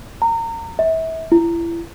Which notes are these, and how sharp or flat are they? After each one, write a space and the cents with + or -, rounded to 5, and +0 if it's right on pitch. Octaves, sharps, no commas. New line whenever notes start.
A#5 -30
E5 -30
E4 +30